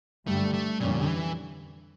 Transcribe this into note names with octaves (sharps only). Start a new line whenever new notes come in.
G2 D3 G3 A3
A3
F2 A#2 D3 G3 C#4
E3